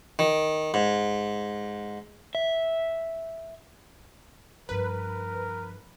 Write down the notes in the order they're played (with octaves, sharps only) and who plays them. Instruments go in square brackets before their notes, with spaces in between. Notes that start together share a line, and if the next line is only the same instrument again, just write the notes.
[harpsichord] D#3
G#2
[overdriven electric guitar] E5
[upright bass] G2 F3 [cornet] A#4 [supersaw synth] B4